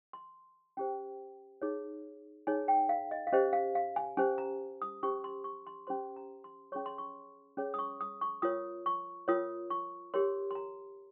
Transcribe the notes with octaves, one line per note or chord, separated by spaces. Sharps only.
C6
C#4 G4 C5 G5
D#4 G#4 C#5
D#4 G#4 C#5 G#5
G5
F5
D#5
F5
C#4 G4 C5 D#5
F5
F5
G#5
C#4 G4 C5 G#5
A#5
D#6
C#4 G4 C5 C#6
C6
C#6
C6
C#4 G4 C5 C6
A#5
C6
C#4 G#4 C#5 C#6
C6
C#6
C#4 G#4 C#5
D#6
C#6
D#6
C#6
F4 A#4 C#5 D#6
C#6
F4 A#4 C#5 D#6
C#6
G4 A#4 C#5 C6
C6
A#5